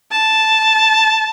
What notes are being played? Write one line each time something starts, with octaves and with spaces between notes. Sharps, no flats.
A5